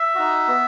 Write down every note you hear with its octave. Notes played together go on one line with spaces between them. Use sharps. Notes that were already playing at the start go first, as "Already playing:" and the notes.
Already playing: E5
D#4 F#4
B3